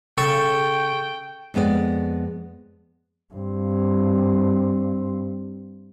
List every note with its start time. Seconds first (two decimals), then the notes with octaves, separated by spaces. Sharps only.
0.18 C#3 A4 G5 C#6
1.54 F2 G#3 B3 G4 D5
3.34 G2 C4